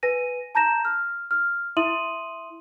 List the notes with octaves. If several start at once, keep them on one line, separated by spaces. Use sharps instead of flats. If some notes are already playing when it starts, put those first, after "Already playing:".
B4 G#5 A#6 D#7
A5 A#5 G6 A#6 E7
F6
F6
E4 E5 C6 D#6 D#7 F#7